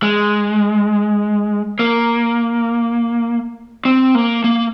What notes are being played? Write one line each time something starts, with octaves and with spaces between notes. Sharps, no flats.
G#3
A#3
C4
A#3
A#3